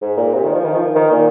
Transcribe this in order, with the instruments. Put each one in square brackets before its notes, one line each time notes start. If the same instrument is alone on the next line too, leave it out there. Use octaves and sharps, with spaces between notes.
[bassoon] G#2
A#2
C3
D#3
F3
D#3
F3
D#3
A#2